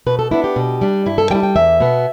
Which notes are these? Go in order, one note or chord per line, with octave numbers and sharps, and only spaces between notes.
B2 B4
A4
B3 D4 E4
G4
B2
G3 D4
G2 E4
A4
G3 E4 G5
G5
E2 E5
B2 B3